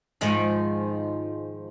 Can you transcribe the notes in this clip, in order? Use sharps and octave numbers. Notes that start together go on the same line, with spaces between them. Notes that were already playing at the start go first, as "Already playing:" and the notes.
G#2 D#3 F3